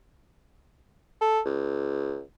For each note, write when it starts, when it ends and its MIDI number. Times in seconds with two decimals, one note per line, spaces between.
1.21 1.40 69
1.45 2.21 37